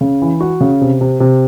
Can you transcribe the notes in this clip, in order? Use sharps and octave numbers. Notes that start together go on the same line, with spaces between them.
C#3
E3
F#4
C#3
C3
C3
C3